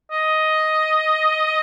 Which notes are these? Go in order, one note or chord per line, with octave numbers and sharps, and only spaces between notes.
D#5